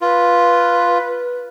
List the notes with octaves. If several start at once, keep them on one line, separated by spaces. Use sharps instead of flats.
F4 B4